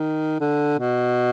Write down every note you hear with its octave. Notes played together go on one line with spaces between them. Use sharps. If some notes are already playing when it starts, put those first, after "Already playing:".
Already playing: D#3
D3
B2